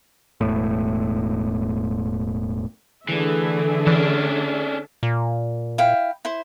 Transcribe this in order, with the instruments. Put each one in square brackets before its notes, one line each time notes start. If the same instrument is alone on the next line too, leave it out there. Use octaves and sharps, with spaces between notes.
[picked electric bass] E1 A2
[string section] D3 [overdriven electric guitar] E3 [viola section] A3 G#4 E5
[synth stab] E3 [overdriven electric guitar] C#4 D4
[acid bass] A#2
[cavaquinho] E4 F5 G5
E4 C5